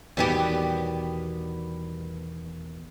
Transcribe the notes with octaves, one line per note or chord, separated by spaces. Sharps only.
E2 B2 D#3 G3 B3 G4